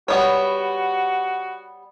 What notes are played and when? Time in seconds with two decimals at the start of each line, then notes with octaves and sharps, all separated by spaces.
0.08 G3 B3 F#4 C#5